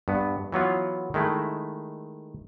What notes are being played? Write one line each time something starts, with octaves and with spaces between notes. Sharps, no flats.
G2 B3
E3 F#3 B3 F4
D#3 G#3 A3 E4